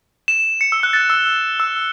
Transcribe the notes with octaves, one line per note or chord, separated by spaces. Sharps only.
E7
C#7
E6
F#6
A6
E6
E6